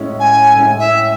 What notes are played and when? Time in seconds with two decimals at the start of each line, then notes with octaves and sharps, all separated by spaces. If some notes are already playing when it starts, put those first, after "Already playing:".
Already playing: A2 G#3 C#4 E4
0.20 G#5
0.56 A2 G#3 C#4 E4
0.79 E5